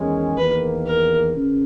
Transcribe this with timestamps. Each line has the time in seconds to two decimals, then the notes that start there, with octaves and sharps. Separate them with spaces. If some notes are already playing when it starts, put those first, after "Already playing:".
Already playing: E2 D#3 G#3 C#4
0.36 E2 D#3 A#3 B4
0.87 A#4
1.36 C#3